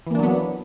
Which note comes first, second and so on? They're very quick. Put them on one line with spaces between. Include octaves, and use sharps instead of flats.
E3 A#3 D4 F#3 B3